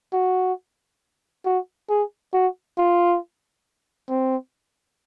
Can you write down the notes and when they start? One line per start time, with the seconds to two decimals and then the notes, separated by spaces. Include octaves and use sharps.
0.13 F#4
1.45 F#4
1.89 G#4
2.33 F#4
2.78 F4
4.09 C4